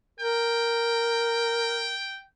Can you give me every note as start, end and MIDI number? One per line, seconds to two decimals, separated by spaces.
0.20 1.94 70
0.20 2.23 79